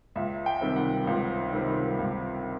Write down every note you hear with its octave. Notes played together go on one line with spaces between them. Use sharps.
C#2 E5
G5
C3 D#3 G3 C4
F#5
C#2
C3 D#3 G3 C4
C#2